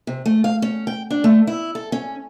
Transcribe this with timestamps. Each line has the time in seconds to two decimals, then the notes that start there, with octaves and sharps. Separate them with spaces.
0.07 C3
0.26 A3
0.44 F5
0.62 C#4
0.87 G5
1.11 D4
1.24 A3
1.47 E4
1.75 A4
1.92 C#4